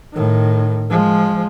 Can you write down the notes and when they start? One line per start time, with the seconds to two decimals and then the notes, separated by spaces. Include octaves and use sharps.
0.13 A2 D#3
0.90 F3 G#3